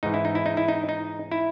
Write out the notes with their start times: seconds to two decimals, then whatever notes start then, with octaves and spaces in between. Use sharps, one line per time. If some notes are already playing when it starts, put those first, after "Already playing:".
0.03 G#2 E3 D#4
0.14 E4
0.25 D#4
0.35 E4
0.46 D#4
0.57 E4
0.68 D#4
0.89 D#4
1.32 E4